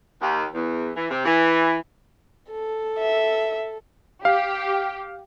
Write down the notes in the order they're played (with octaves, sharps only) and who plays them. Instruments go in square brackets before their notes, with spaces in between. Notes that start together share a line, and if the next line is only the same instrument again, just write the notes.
[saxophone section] D#2
E2
E3
C3
E3
[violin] A4
[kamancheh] E5
[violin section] G4 [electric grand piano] F5